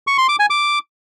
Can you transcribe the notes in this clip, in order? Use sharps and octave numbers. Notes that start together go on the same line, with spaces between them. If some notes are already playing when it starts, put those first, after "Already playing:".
C#6
C6
D6
G#5
D6